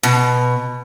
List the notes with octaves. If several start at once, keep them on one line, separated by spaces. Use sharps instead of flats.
B2